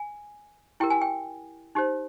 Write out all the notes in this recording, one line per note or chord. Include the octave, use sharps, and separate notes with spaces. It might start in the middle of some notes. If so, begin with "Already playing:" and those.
Already playing: G#5
E4 G4 A#4 G5
G#5
G5
D#4 G4 C5